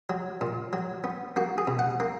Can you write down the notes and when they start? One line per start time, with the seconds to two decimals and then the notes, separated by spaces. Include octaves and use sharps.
0.10 F#3
0.41 A#2
0.73 F#3
1.04 B3
1.36 A#3 F#4
1.58 G#4
1.67 B2
1.79 F#5
2.00 A#3